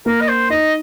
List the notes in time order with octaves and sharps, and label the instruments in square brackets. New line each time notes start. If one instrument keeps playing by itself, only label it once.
[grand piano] A#3 [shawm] A#4
[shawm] D#5
C5
[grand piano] D#4 [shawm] D#5